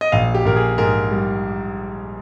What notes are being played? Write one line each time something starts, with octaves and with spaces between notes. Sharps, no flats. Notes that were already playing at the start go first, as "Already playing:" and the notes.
D#5
A#1 F5
G4
A#1 A#4
G#4
G#2 A#4
G3